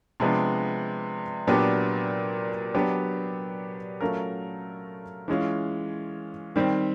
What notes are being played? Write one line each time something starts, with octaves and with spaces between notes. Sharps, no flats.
C3 F3 G#3 B3 D4
A#2 F#3 B3 D4 G4
F#3 B3 D4 G4
F#3 A3 C#4 F4 A#4
E3 G#3 C#4 F4
D#3 G3 C4